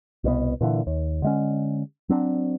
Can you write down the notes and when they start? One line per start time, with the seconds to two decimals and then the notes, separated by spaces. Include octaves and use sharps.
0.24 C2 B2 B3
0.61 A#2 D3 E3
0.87 D#2
1.22 D3 G#3 C#4
2.09 F#3 C4 D4